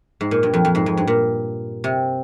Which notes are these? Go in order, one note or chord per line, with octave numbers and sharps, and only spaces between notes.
G#2
A#2
G2
F2
F2
G#2
F2
G2
A#2
C3